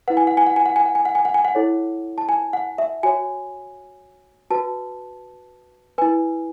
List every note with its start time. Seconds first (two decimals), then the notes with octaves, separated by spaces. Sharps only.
0.08 E4 B4 F#5
0.17 G#5
0.27 F#5
0.37 G#5
0.47 F#5
0.56 G#5
0.66 F#5
0.76 G#5
0.85 F#5
0.95 G#5
1.05 F#5
1.15 G#5
1.25 F#5
1.34 G#5
1.45 F#5
1.55 E4 A4 C#5
2.18 A5
2.29 G#5
2.53 F#5
2.78 E5
3.03 F#4 C#5 G#5
4.50 F#4 B4 A5
5.98 E4 B4 G#5